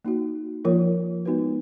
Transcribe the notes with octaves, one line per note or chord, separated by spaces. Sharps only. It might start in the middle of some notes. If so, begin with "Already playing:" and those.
A#3 D#4 F#4
F3 A#3 F4 A#4 C#5
G#3 B3 D#4 F#4 B4